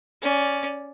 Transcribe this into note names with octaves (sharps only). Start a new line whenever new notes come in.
C#4 D5